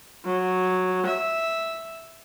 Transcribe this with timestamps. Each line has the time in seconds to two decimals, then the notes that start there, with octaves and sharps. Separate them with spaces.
0.25 F#3
1.06 E5